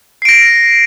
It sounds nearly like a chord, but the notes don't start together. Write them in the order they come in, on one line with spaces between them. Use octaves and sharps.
C7 D7 A#6